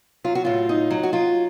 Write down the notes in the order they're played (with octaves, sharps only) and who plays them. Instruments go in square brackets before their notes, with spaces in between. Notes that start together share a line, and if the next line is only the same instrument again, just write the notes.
[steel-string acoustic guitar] F#3 F4
F#4
A2 F4
D#4
F#3
F#4
F#3 F4